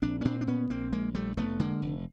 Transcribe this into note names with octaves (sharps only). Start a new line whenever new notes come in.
A#1 C4 D4
C#4
A#2 C4 D4
D4
A#2 B3 C#4
A#1 A#3 C4
A#1 G#3 A#3
A#1 G3 A3
F1 A3 B3
D3 G#3 A#3
F1